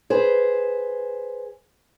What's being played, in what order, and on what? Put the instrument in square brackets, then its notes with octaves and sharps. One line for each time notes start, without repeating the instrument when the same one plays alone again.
[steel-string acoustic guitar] G#4 B4 C5